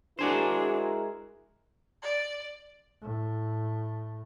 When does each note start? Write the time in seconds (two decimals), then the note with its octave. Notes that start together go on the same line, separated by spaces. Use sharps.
0.19 G#3 D4 E4 F#4 G#4 A#4 C5
2.02 D5
3.02 A2